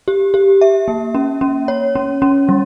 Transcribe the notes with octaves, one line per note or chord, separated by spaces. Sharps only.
G4
G4
E5
A#3
C#4
C#4
C#5
C#4
C#4
G3